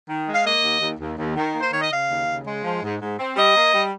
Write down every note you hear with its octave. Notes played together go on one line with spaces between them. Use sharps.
D#3
G#3
F5
A#3 D#5
D#2
D#2
D#2
D#2
D#3
A#3
C5
D#3 C#5
D#5
C#3 F5
D#2
C#3
G#3
F3
G#2
G#2
C4
G3 D#5
A#3
G3